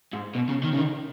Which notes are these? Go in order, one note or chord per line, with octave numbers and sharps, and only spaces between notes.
G#2
B2
C#3
D#3
C#3
D#3